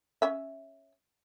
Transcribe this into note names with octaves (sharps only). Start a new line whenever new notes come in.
C#4 E5